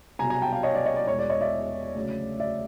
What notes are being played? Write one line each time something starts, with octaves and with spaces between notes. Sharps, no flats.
C2 B2 F#3 G#5 A#5
G#5 A#5
G5 A5
F5 G5
C#5 D#5
D5
C#5 D#5
D5
E1 E2 B2 C#5
D5
C#5 D#5
D5 E5
D2 C#3 F#3
D5 E5